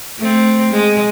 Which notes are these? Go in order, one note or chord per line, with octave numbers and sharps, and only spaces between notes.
A3 C4
G#3